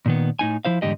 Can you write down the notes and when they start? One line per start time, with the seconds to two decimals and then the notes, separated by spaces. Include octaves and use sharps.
0.06 A#2 D#3 B3
0.39 A2 D#4 G#5
0.65 F3 E4 C5 F5
0.82 E2 G#2 D3 G3 G4 D#5